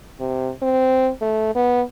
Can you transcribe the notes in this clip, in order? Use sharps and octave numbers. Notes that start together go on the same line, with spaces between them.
C3
C4
A3
B3